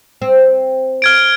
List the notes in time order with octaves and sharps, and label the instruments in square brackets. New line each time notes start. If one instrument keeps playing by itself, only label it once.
[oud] C4
[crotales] F6 G#6 D7